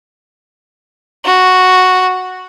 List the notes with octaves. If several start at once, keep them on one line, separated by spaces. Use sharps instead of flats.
F#4